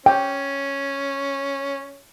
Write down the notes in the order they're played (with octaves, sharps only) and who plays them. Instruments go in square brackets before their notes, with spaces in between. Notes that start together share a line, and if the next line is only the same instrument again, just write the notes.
[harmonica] C#4 [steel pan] G5